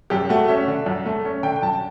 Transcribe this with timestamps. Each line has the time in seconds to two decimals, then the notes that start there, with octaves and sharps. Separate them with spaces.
0.10 F#2 G4
0.29 A3 F#4
0.48 C#4 E5
0.67 D3
0.86 F#2
1.06 A3
1.25 C#4
1.43 D3 G5
1.56 G5
1.63 F#2 A5